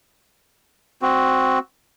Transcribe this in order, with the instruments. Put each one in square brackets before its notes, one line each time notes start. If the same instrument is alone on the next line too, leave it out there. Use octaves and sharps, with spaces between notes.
[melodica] C4 F#4